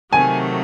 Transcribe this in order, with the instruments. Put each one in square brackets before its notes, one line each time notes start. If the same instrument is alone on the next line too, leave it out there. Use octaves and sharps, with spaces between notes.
[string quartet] C3 D#3 F#3 A3 [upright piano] G#5